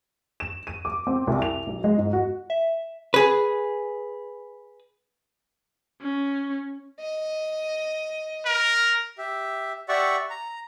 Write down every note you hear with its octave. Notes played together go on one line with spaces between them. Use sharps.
E7
D#7
D6
C4
C2
F7
B1
G#3
G#2
F#4
E5
G#4 B4
C#4
D#5
A#4
G4 E5
G4 D5 E5 F#5 C#6
A#5